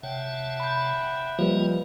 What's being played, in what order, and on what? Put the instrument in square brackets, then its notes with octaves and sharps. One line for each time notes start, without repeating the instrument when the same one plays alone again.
[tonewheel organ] C3 C#5 A5 [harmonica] E5 F#5 G5
[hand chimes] B5 G6
[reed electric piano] F3 G3 [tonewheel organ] A#3 C#5 D#5 [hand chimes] F4 B4